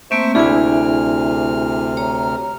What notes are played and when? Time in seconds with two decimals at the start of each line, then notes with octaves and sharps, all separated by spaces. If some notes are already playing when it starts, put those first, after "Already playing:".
0.11 A3 A#3 C4 C5 E5 C#6
0.35 D2 C3 D4 E4 G#4 G#5 F6
1.97 C#5 A#5